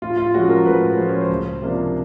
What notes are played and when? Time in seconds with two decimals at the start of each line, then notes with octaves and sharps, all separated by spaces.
0.02 A2 F4
0.17 F4
0.34 F3 G#3 C#4 F#4
0.49 A#4
0.65 A2 B4
0.97 F3 G#3 C#4 C5
1.09 C#5
1.21 C5
1.29 C#2
1.61 C3 F3 A#3 D4